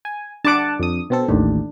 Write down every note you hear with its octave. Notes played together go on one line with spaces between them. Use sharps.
G#5
D4 F#5 A5 D6
F2 D#6
B2 C4 A4
A1 D#2 A2 D4